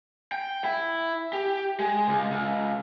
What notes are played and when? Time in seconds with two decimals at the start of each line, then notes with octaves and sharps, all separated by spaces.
0.32 G5
0.64 E4
1.33 G4
1.80 G#3
2.08 C#2
2.32 C#2